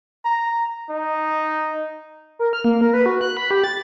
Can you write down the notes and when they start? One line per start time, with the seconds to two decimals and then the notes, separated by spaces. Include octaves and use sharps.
0.25 A#5
0.90 D#4
2.39 A#4
2.53 F6
2.64 A#3
2.81 A#4
2.93 B4
3.06 F#4
3.21 F#6
3.37 B5
3.51 G4
3.64 A6